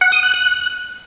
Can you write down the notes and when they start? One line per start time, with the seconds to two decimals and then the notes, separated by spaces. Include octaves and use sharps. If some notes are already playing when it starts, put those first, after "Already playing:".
0.01 F#5
0.12 D#6
0.23 F#6
0.34 F#6